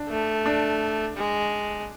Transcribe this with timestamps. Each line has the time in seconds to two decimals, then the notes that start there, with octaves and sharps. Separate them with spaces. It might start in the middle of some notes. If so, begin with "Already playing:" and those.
Already playing: D4
0.09 A3
0.46 D4
1.17 G#3